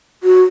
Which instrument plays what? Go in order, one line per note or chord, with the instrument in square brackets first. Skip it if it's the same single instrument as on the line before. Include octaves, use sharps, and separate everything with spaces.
[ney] F#4